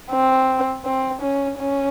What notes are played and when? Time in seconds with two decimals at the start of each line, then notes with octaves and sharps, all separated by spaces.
0.11 C4
0.85 C4
1.21 C#4
1.58 C#4